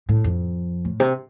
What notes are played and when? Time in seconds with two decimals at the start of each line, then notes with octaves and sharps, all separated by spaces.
0.09 A2
0.24 F2
0.85 A2
1.00 C3